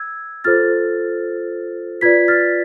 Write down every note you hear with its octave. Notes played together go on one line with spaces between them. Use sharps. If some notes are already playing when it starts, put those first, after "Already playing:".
Already playing: E6 G#6
F4 A4 C5 F6 A6
F4 B4 D5 G#6 B6
F6 A6